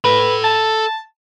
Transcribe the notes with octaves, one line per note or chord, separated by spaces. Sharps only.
A4 B4 B5
A5